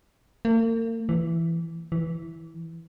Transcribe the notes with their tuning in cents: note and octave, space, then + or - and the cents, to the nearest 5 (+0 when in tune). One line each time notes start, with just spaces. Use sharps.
A#3 -40
E3 +10
E3 -5